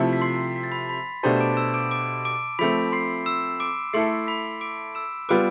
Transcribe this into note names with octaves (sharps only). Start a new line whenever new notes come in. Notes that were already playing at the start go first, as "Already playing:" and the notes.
Already playing: C3 F3 A3 E4 A4
B6
C6 C7
B6
A6
B5 B6
B5 B6
B2 A3 D4 G4 C5 A5 A6
E7
D6 D7
E6 E7
D6 D7
D6 D7
D6 D7
F3 A3 C4 B5 B6
C6 C7
E6 E7
D6 D7
A3 E4 A4 C6 C7
B5 B6
D6 D7
E6 E7
G3 B3 F4 B4 D6 D7